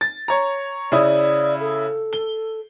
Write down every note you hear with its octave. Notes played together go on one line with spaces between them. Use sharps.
A6
C#5 A#5
C#3 E4 D5 D#6
A4
G7